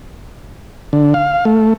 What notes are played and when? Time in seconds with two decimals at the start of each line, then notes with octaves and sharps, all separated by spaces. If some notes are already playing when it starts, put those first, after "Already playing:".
0.93 D3
1.14 F5
1.45 A3